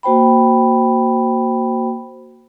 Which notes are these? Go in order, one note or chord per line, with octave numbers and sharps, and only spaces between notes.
A#3 F#4 C5 G5 B5